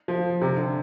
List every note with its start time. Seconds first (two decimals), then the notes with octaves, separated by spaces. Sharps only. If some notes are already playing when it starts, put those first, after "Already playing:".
0.08 F3
0.41 C3
0.57 D3